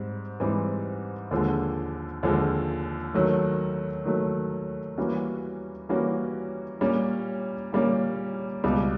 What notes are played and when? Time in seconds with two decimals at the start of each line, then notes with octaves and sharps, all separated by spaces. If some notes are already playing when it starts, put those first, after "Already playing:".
Already playing: G#2 G3 C4
0.40 G#2 E3 G3 C4
1.31 D#2 D3 F3 G#3
2.23 D#2 D3 F3 G#3
3.14 D#3 F#3 A3
4.05 D#3 F#3 A3
4.98 E3 G3 A#3 C#4 F#4
5.89 E3 G3 A#3 C#4 F#4
6.81 A#2 G3 A#3 C#4
7.72 A#2 G3 A#3 C#4
8.64 C#2 B2 G3